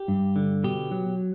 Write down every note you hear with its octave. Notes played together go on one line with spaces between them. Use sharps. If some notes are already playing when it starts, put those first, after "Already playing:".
Already playing: G4
G2
D3
B2 G4
F#3